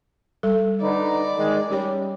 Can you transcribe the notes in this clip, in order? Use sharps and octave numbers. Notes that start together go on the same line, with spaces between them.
G3 A4
D3 D#4 B4 D5
D#3 G#3
G3 C#4 G4 C#5